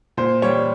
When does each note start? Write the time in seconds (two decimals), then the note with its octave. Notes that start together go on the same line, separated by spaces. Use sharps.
0.17 A#2 C5
0.42 G3 C#5